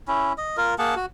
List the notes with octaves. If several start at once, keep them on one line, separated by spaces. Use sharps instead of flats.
C#4 E4
D#5
F4 A#4
A#3 G#4 F#5 A5
F#4